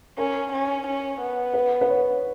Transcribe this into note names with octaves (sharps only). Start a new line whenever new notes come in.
C#4 A#4
C#4
C#4
B3
B4
B4
C#5